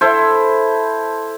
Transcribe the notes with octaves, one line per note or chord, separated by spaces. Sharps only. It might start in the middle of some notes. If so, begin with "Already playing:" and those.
E4 A4 C5